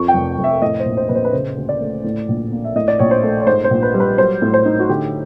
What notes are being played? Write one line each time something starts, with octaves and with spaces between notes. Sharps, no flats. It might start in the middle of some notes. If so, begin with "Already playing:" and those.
Already playing: F2 C#6
G5
F1
F1
E5
A2 D#5
C5
A#1
C5
A#1 B4
C5
B4
C#3 C5
D2
D5
A3
A2
A#1
A#3
E5
A2 D#5
D5
A#1 C#5
C5
A3
C#5
G#2 C5
C5
A#1
B4
G3
B4
F#3 C5
A2
C5
D#4
F#4
D3 G4